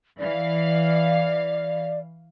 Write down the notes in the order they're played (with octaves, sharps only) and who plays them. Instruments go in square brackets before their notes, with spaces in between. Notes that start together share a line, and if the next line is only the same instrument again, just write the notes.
[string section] E3 F5 [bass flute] D5